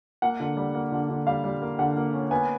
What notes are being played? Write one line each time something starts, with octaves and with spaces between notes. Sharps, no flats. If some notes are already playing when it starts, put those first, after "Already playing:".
A#3 F#5
D3
G3
A#3
D3
D3
G3 F5
G3
A#3
D3 F#5
A#3
C#4
B3 G#5